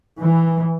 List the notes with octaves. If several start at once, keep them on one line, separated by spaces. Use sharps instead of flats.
E3